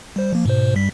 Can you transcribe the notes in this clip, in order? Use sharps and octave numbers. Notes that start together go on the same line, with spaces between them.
G3 C5
F3 A#3
G#2 B2 C5
G2 G3 B6